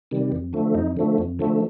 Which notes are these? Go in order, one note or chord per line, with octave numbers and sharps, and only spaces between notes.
C3 D#3 G3
F2
D3 F3 A3
F2 D#4
D3 F3 A3
F2
D3 F3 A3